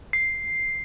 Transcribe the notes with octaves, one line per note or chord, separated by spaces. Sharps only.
C7